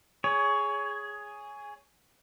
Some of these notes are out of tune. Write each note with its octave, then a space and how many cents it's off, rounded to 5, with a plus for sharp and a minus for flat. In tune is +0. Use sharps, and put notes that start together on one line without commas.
G#4 +0 C#5 +15